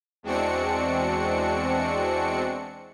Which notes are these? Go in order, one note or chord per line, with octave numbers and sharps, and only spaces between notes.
E2 G#3 C4 D4 F#4 C#7